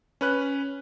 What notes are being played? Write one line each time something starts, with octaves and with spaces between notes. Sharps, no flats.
C#4 B4 F#6